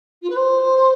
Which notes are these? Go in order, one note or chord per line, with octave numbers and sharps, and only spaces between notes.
F4
B4
C5